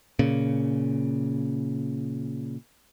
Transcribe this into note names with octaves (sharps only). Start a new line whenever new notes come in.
A#2 C#3